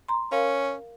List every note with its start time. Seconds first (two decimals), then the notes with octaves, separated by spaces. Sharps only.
0.08 A#5 C6
0.32 C#4 A#4 F5